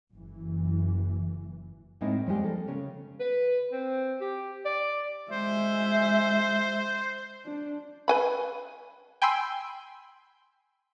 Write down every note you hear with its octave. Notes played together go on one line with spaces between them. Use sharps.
F#1 E3
A2 G#3 A#3 C4 D#4 E4
F3 G3 G#3 G4
A#3 A4
C#3 C#4
B4
C4
G4
D5
G#3 C5 E5
D4
B4 G#5 B5
G5 G#5 B5 C6 E6